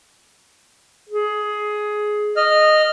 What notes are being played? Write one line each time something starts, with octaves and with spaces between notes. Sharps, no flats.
G#4
D#5 F6